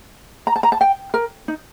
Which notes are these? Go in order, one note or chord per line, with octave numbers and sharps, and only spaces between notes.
A#5
A5
A#5
A5
G5
A#4
D#4